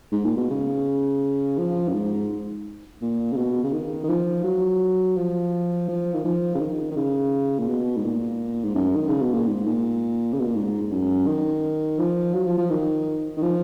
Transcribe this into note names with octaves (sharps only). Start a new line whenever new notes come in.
G#2
A#2
B2
C#3
F3
F#2
G#2
A#2
C#3
B2
C#3
D#3
D#3
F3
F#3
F3
F3
D#3
F3
C#3
D#3
D#3
C#3
A#2
B2
G#2
A#2
G#2
F#2
D#3
C#3
B2
A#2
G#2
A#2
C#3
B2
A#2
G#2
G#2
F#2
D#3
F3
F#3
F3
F3
D#3
D#3
F3